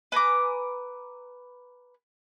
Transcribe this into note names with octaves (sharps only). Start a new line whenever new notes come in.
B4 G#5 A#5 D6